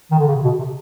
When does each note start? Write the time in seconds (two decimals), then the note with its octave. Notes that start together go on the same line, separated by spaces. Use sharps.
0.11 D#3
0.19 D3
0.27 C#3
0.36 C3
0.44 B2
0.59 C3